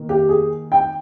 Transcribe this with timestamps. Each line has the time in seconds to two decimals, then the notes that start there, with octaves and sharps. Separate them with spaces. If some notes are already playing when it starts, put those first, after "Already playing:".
Already playing: D#3 A#3
0.09 G4
0.29 G#4
0.72 G5